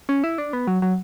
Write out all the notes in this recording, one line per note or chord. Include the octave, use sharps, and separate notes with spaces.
C#4
E4
D4
B3
F#3
F#3